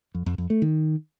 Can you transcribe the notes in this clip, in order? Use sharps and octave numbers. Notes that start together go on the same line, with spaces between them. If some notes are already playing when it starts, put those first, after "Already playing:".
F2
F2
F2
A3
D#3